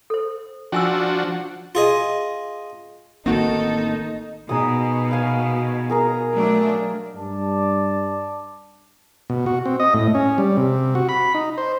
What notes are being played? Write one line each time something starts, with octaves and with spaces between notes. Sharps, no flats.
A4 C5
F3 C#4 D4 F#4 G#5 E6
F4 G#4 D#5
A1 D#3 A#3 C4 D#4 F#4 A4
B2 D#4 G#4 D#6
F5 G#5
G#4 A#4 A#5
F#3 A3 D4
G2 D5 A5
B2
F#4
C4
D#5
A2
C#4
G3
C3
F#4
B5
D#4
C5